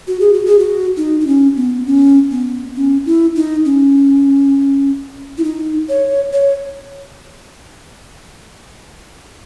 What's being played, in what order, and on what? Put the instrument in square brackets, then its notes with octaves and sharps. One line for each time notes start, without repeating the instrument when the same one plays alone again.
[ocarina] F#4
G#4
F#4
G#4
F#4
D#4
D#4
C#4
B3
C#4
B3
C#4
E4
D#4
C#4
E4
D#4
C#5
C#5